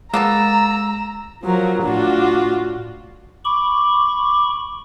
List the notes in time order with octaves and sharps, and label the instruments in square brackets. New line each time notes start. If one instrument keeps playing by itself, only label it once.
[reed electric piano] G#3 [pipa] A#3 B3 A4 [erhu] A#5 [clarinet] E6
[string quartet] F3 F#3 A#4
A2 D4 F4 F#4
[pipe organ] B5 C#6 [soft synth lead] D6